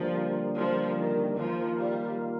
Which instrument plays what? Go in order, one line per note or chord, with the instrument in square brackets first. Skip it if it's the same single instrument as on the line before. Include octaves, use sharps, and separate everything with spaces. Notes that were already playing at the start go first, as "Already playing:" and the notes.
Already playing: [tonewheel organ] D3 G3 A#3 [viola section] F3
[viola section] F3
D#3
[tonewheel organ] D#3 A#3 F4 [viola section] F3
[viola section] G3